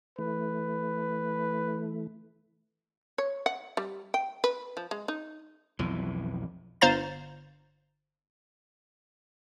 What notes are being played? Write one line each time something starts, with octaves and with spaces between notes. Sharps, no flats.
E3 A3 B4
C#5
F#5
G3
G5
B4
F3
G#3
D#4
B1 F2 E3
G1 C5 F5 A#5 A6